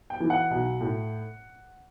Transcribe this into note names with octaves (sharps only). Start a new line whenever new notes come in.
G5
E3
F#5
B1
A2